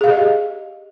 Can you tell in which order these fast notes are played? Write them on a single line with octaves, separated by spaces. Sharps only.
G#4 F5 G4 D#5